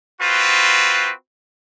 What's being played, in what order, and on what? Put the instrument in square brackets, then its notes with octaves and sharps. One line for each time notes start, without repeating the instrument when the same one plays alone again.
[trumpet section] C4 F4 F#4 B4